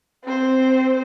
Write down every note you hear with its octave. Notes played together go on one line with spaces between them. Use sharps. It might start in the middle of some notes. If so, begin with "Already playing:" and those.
C4 C5